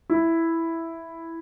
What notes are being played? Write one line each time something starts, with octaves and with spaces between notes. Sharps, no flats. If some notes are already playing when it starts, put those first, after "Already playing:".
E4